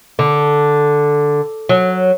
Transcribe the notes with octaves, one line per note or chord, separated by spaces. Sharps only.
D3
F#3